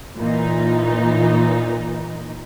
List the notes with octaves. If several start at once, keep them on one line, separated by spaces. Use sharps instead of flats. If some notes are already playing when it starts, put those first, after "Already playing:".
A#2 E3 D#4